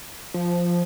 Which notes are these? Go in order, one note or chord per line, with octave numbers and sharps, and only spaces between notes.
F3